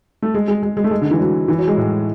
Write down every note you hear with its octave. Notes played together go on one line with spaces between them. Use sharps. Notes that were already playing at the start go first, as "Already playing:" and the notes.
A3
G#3
G#3
G#3
G#3
A3
G#3
D3
E3
F#3
E3
F#3
G#3
A2